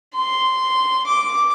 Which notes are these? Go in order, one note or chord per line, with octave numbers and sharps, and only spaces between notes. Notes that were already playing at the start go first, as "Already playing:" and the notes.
C6
D6